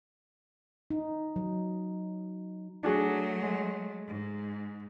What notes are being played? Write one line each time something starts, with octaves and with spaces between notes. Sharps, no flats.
D#4
F#3
F#3 A3 D4 F#4 G#4
G#3
G#2